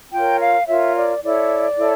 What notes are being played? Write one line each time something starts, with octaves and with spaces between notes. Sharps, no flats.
F4 A#4 C#5 G5
F5
F4 A#4 C#5 E5
D5
E4 A4 C#5 D5
E4 A4 C#5